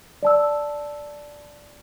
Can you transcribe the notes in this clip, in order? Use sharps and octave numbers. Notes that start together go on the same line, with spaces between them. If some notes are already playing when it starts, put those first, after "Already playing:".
D5 A5 E6